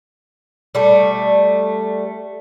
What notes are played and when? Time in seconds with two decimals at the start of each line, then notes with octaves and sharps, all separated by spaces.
0.75 G3 A3